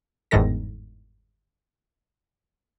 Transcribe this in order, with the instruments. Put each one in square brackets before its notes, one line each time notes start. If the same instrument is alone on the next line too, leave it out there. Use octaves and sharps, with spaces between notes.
[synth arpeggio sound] G1 E2 G#2 D#3 A4 A#6